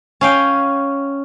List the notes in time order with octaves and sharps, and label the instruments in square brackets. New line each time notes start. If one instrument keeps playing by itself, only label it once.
[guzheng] C#4 F5 G5